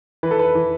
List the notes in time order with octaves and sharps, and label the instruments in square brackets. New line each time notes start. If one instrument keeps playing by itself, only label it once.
[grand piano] E3 B4
A4
B4
E3